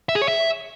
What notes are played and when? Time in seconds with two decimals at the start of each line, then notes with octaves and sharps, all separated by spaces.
0.09 E5
0.15 G#4
0.22 C#5
0.28 E5